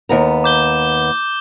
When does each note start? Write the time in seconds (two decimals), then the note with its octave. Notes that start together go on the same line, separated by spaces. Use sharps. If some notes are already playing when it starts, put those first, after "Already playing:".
0.09 D#2 B3 A#5
0.44 D6 G6 G7